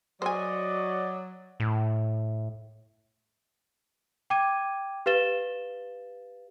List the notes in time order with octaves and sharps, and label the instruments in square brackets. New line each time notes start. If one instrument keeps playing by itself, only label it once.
[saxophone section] F#3 [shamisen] C5 G#5 [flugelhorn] D5 [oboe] D#5
[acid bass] A2
[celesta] G5 D6 G#6 D#7
G4 B4 F5 A6 E7 G7